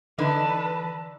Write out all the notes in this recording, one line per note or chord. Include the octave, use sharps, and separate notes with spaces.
D3 E3 D#4 B4 A5